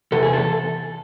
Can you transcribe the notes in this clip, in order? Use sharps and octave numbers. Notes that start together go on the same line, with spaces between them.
E2 C3 A4
G#4
A4